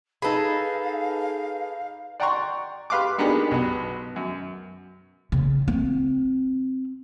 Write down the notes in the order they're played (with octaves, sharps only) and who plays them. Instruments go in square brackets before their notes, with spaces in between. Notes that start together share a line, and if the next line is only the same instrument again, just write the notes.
[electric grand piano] D#4 B4 B5 [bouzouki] G#4 A4 [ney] F5
[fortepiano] D5 F#5 G5 A#5 C6 C#6
G4 B4 F5 C6 D6
A#3 B3 D4 D#4 G4 G#4
B1 B3
F#2
[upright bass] C#3
C4